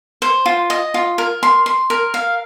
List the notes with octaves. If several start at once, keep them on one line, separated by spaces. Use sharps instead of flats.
C5
F4
D#5
F4
A#4
C6
C6
A#4
F5